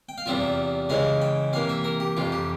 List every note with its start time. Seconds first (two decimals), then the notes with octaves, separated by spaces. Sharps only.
0.09 G5
0.18 F5
0.26 E2 C3 G3 C4 F4 E5
0.89 C#3 E3 G#3 E4 F5
1.22 G5
1.53 C3 E3 A#3 F5
1.69 E5
1.84 A#4
2.00 G4
2.17 F2 C3 E3 F4
2.32 G4